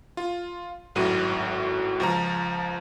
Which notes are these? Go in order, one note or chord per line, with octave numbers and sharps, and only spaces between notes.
F4
G#1 F#2 A2 F#4 D#7
C#2 F3 A#5